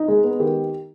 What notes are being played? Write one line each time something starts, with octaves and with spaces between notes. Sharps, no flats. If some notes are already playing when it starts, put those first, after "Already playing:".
Already playing: D#4
G#3 G#4
B3
D#3 G4